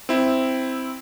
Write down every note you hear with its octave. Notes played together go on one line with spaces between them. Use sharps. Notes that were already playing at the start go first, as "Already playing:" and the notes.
C4 E4